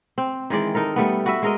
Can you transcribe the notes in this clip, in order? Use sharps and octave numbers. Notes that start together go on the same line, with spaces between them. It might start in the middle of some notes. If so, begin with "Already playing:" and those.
C4
D#3 E3 G#3 D5
D#4 A4 A#4
G3 A3 B3
F#4 B4 E5
G#3 A#4 D#5